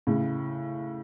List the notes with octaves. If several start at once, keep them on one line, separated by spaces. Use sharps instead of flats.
A2 C#3